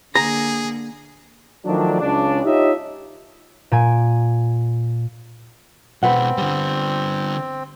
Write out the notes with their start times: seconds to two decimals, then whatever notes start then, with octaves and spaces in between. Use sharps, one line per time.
0.15 D3 A#3 G#4 A#5
1.66 D#3 F3 F#3 A3 D4
2.00 C#2 C#3 D4
2.45 D#4 F4 G4 C#5 D#5 E5
3.72 A#2 G#5 D7
6.03 B2 G#3 C4 B4 F#5
6.38 D3 G3